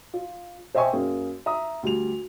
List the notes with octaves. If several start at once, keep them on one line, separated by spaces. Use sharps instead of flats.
F4
C5 D#5 E5 G5 G#5 C#6
F#2 A#3 G#4
E5 A#5 D#6
D2 G3 F7